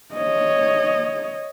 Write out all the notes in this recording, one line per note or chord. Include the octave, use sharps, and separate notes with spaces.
C#5 D#5